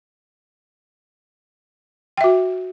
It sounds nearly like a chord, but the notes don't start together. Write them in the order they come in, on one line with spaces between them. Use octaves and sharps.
G5 E5 F#4